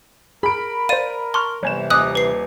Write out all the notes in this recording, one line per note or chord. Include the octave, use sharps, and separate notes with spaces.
G#4 A#4 B5 D7
C5 D5 F5 D#7
A5 C6 C#6 F6
G1 C3 E3 C#5 G#5 E7
D#1 D#5 G#5 D6 D#6 F#6
B4 C7